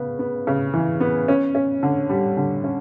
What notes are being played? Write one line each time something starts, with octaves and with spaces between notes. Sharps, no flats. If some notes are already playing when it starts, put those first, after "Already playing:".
Already playing: C#3 B3
B3
C#3
E3
B3
C#4
C#4
D3
G3
D3
C#4